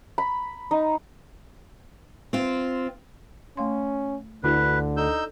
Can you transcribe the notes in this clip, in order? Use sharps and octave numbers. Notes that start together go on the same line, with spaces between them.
B5
D#4
C4 F4
A3 C#4 F5 C6
D2 D3 D4 E4 F#4 B4
D#4 A4 D5 E6 G6